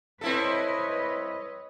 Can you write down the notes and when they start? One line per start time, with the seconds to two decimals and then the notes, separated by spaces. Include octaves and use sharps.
0.21 C4 E4 A4 B4 C#5 D#5